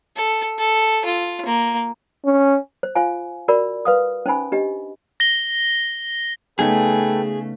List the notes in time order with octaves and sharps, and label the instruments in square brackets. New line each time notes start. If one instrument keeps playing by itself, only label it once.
[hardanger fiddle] A4
A4
F4
A#3
[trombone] C#4
[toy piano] C5
F4 C5 F5 G#5
F#4 A#4 D5 B5
B4 F5 D#6
C#4 D#4 C5 G#5 B5
D4 G4 D#5
[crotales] A#6 G7
[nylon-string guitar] C#3 B3 D#4 [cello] A3 [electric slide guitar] G#4 [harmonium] A4 B4 G5